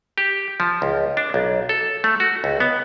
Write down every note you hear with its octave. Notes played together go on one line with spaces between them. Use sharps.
G4
F3
C#2
D4
B1
A4
A3
F#4
C#2
B3